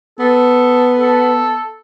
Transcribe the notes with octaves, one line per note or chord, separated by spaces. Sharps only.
B3 A4
A4